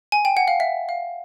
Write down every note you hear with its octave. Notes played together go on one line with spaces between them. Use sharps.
G#5
G5
F#5
F5
E5
F5